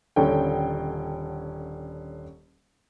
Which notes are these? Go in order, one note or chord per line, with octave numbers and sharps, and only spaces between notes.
D#1 D3 C#4 A4 G5